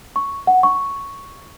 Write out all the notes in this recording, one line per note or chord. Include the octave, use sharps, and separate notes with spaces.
C#6
F#5
C#6